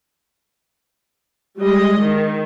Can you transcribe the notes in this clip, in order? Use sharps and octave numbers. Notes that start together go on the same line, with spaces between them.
G3 G#3 D#5
D#3